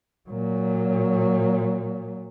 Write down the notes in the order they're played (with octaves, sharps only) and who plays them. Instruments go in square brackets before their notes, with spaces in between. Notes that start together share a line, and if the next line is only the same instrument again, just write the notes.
[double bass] A#2 F#3